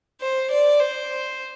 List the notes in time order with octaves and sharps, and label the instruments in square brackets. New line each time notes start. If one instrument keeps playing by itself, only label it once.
[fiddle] C5
D5
C5